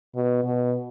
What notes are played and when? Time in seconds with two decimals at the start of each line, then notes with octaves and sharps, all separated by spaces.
0.15 B2
0.44 B2